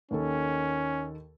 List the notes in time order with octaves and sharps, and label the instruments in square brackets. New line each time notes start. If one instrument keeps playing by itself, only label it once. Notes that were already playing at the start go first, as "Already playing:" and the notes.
[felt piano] D#2 D#3 A4 [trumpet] C#4